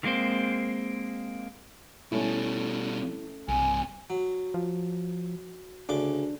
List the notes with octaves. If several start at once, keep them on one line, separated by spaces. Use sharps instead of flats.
D#3 G#3 A#3 C4 C5
B2 G3 A3 C#4 D#4 E4
B1 G2 C3 G#5
F#3
F3
D2 C#3 D4 D6